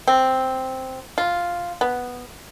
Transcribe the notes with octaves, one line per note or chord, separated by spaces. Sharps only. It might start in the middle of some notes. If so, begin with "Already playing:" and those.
C4
F4
B3